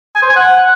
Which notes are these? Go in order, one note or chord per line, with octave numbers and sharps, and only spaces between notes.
G#5
C5
G#5
F#5